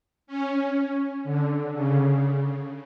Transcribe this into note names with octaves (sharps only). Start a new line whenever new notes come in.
C#4
D3
C#3